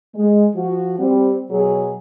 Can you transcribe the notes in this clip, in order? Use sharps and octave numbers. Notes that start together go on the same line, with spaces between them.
G#3
F3 F#4
G3 C4
B2 F#3 G#4